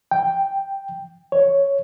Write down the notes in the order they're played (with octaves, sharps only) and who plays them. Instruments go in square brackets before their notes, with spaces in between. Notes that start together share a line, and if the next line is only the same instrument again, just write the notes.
[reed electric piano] G5
C#5